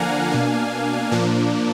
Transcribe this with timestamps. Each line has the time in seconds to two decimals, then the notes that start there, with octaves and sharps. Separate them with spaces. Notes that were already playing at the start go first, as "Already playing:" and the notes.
Already playing: D3 F3 A#3 D4 F5 F#5 G#5 A#5
0.31 B2 A#3 D4
1.12 A#2 F3 A#3 D4